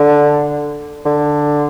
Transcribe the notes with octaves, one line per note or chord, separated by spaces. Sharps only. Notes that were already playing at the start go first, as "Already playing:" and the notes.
Already playing: D3
D3